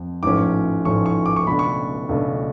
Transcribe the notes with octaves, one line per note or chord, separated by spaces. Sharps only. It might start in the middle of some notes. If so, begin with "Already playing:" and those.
Already playing: F2
A1 G#2 F3 A3 C#4 D6
A1 G#2 F3 A3 C#4 C#6
C#6
D6
C#6
C#2 B2 A3 D4 B5
C#6
C#2 B2 A3 D4